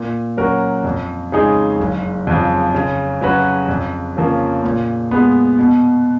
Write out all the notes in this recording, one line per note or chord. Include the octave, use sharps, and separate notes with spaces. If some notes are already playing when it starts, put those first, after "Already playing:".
Already playing: A#2
F#3 C#4 F#4 A#4
F2
C#3 G#3 D#4 G#4
F#1
F2 C#3 F3
C#3
F#3 C#4 F#4 B4
F2
C#3 F3 A#3 C#4
A#2
G#3 B3
B2